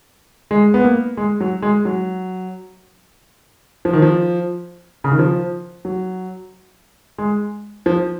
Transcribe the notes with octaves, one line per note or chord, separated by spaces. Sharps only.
G#3
B3
A#3
G#3
F#3
G#3
F#3
F3
D#3
F3
C#3
D#3
F3
F#3
G#3
F3